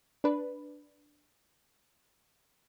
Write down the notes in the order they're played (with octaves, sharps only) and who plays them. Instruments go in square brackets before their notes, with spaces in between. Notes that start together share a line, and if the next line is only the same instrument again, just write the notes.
[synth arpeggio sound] D4 B4